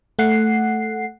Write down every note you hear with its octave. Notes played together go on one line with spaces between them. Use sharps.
A3 F#5 C7